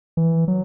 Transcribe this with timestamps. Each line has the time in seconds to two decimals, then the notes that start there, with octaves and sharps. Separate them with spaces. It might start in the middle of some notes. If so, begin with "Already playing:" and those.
0.17 E3
0.48 F#3